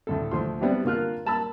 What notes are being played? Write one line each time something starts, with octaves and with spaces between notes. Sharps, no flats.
D2 A2 A4
D2 F3 C6
G3 B3 C4 D4 E4 G4
D3 A#3 F4 F6 F#6
A#3 A5 B5 E6